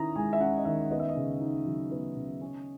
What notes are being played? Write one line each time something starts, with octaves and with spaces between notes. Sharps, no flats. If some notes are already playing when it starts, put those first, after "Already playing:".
Already playing: D#3 C#4 E4 A#5 D#6
G#3 G#5
E5
C#4 F#5
D#5
D#3 E5
B3 D#5
E5
D#5
C#3
D#4
F#3
B3
C#3
C#4